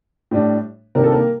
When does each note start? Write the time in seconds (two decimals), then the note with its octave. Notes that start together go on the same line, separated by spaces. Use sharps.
0.31 A2 G3 D4
0.95 C3 D#3 G3 A#3 D4 A#4
1.04 A4
1.12 A#3 A#4